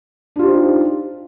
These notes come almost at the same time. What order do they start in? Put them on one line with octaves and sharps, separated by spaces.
D4 F4 G4 C5 D#4